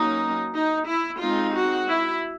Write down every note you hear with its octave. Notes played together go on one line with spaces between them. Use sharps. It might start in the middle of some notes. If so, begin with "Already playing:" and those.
Already playing: F#3 A#3 C#4 D#4
D#4
E4
G#3 C4 D#4 F4
F#4
E4